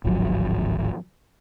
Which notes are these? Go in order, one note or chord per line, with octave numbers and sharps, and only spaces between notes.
D1 G#1 F3 F#3